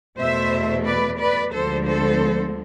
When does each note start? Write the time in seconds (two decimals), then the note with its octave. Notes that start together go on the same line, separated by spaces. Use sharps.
0.17 E2 B2 A3 C5 E5
0.85 B4 D5
1.18 B4 D5
1.52 D2 D3 F3 G#3 B3 A4 C5
1.86 A4 C5